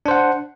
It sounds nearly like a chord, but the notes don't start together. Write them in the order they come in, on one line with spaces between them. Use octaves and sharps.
D4 C5 F#5